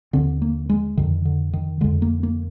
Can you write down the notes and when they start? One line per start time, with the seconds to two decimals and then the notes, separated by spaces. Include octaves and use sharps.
0.13 D#2 D3 C4
0.42 A#3
0.69 G#3
0.97 F2 D3 D#3
1.25 D3
1.53 D#3
1.81 F2 D3 G#3
2.02 A#3
2.23 A#3